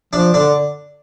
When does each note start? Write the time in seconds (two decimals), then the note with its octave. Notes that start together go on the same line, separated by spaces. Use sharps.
0.13 F3 D4
0.34 D3 D4